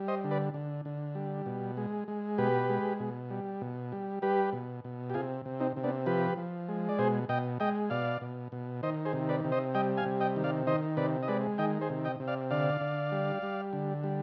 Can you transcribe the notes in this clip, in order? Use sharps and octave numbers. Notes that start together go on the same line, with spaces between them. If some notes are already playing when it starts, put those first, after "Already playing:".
Already playing: G3
C5 D#5
D3
B4 D5
D3
D3
G3
B2
G#3
G#3
B2 G4 B4
G#3
B2
G3
B2
G3
G3 G4 B4
B2
B2
G4
C3 F4 G#4
C3
C4 D#4
C3
B3 D4
F3 G4 B4
F3
G#3
D5
B2 G#4 C5
B2 D#5 G5
G#3 D#5 G5
B2 D5 F5
B2
B2
D#3 C5 D#5
G#4 C5
C3
B4 D5
C3
C5 D#5
G3 D#5 G5
F5 G#5
C3
D#5 G5
D#3
D5 F5
D#3 C5 D#5
C3 B4 D5
D#5
G#3 B4 D5
D#3 D#5 G5
G#4 C5
C3
D#5 G5
C3
D5 F5
D3 D5 F5
D3
G3
G3
D3
G3